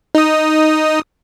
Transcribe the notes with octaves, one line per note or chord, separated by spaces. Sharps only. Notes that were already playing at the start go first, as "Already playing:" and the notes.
D#4 D#6